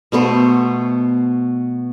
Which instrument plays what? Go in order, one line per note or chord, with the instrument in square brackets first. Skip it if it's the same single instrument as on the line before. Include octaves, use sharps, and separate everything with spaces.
[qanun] B2 A3 B3 C5